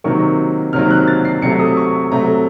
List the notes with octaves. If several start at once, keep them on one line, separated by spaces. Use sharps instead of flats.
C3 D#3 F#3 A#3 C#6
C3 D#3 F#3 A#3 F6
F#6
A6
C7
C3 F#3 A3 C#7
D#6
C#6
C3 F#3 A3 A#5